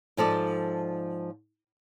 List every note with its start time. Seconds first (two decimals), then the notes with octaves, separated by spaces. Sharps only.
0.17 G#2 F3 A4 D5